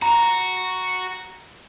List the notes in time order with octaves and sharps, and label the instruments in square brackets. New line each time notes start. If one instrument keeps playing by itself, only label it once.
[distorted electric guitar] F#4 [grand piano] A#5